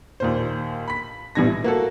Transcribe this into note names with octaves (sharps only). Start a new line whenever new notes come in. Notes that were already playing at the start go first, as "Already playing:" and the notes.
D#2 A#2 C5
B5 B6
A#1 B2 E3 G3 G#6 A#6
E4
A#3 F#4 A4